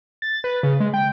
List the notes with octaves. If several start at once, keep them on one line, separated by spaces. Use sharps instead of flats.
A6
B4
C#3
G#3
G5